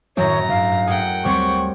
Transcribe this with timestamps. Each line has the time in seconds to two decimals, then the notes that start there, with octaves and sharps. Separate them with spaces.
0.17 F#2 A2 D#3 C#5 A#5
0.49 G2 F5
0.87 G#4 A#4 F#5 G5
1.25 D2 G3 C4 C#5 C#6